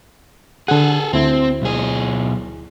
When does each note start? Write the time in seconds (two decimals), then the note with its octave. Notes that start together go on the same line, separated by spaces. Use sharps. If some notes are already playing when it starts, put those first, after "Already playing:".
0.68 D3 G#4 A4 F#5
1.13 D2 C4 E4
1.62 B1 G#4